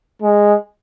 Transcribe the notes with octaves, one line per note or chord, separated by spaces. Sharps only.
G#3